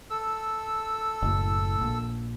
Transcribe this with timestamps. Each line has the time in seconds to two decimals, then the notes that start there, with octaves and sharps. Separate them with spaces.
0.10 A4 E6
1.22 F#1 A2
1.81 A#1